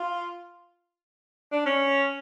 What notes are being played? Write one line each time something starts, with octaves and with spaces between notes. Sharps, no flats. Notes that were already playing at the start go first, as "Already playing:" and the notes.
Already playing: F4
D4
C#4